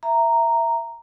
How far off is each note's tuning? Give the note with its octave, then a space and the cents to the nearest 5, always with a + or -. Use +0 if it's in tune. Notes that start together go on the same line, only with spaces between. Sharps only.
E5 +5 A#5 -5